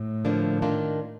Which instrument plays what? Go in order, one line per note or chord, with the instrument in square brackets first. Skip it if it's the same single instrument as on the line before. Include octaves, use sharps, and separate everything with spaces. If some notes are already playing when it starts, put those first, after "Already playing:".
Already playing: [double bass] A2
[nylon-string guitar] D3 F3 A#3 D4
D#3 A#3 D4 F4